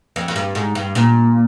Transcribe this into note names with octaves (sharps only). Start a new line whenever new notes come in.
F2
F2
G2
G#2
G2
A#2